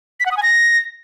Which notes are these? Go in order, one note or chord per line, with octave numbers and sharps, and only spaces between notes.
B6
F#5
D#6
G#5
A#6